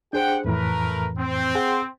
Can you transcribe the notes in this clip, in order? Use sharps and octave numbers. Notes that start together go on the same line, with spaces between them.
D4 G4 G#4 C5 F#5 G5
F2 A2 E3 A3 A#4 B4
C4
G#4 F#5 G5